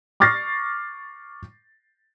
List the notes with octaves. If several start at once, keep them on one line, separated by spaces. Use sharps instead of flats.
C#6 D6 F6 A6 A#6 C7